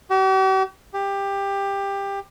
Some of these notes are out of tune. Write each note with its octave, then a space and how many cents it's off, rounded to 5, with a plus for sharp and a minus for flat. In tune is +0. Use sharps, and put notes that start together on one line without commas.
G4 -45
G4 +15